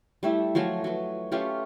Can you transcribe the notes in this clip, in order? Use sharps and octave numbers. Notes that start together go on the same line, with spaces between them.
G3 A3 E4
F3 F#3 A3 G#5
F#3 B4
A3 C#4 F4 G4